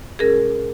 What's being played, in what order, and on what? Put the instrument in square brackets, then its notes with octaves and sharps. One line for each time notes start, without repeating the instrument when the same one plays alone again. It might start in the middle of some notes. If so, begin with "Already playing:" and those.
[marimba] B2 G#3 C#4 G#4 A#4